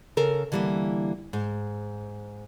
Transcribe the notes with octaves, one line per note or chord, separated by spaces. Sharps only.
C#3 A4 A#4
D3 E3 G3 G#3 A#3
G#2